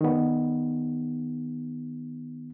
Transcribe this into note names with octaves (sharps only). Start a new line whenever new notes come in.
D#3 B3